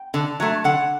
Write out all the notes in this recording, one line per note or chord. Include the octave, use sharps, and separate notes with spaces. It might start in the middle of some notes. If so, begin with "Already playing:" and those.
Already playing: G5
D3
F#3 A3
D3 F#5